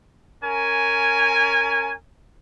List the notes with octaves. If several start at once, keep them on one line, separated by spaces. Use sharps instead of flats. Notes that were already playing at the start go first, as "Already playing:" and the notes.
C#4 A#4 G#5